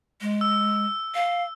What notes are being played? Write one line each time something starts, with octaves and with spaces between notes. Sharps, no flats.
G#3
E6
F5